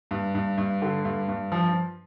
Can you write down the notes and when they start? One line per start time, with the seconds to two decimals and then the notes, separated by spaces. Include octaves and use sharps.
0.11 G2
0.35 G2
0.58 G2
0.82 D3
1.05 G2
1.28 G2
1.52 F3